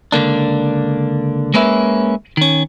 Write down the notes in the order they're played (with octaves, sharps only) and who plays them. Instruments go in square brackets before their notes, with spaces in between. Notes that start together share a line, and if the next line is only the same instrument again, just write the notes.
[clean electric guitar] C#2 D3 A#3 D4
G#3 A#3 C#4 B4 E5
D#3 C#4